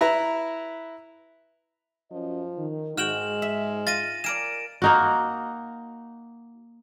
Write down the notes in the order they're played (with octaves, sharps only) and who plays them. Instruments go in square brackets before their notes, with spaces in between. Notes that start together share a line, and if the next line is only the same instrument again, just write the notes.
[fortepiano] E4 B4 E5 A#5
[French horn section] F#2 C#4 D#5 [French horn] F3
[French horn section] D#3
[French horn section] G#2 [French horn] G#3 [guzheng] F#4 G5 [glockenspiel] F6 E7 F#7
[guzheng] E5
[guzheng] F4 [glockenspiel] A6 A#6 D#7
[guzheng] G#4 A#4 D5 [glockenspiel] D7 E7
[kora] A#3 D#4 F#4